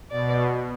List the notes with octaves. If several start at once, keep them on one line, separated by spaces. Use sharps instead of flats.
B2 D5